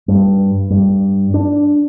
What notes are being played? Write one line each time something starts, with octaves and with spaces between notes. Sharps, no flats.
G2
G2
D4